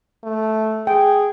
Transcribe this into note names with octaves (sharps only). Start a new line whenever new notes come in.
A3
G#4 G5